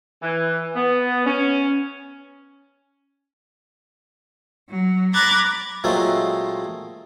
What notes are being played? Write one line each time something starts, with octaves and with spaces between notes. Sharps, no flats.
E3
B3
C#4
F#3
A#5 B5 D6 F#6 G#6 A6
A#2 F#3 G#3 A3 C4